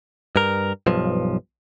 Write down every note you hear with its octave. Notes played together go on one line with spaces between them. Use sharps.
G2 A#4
B1 G2 F3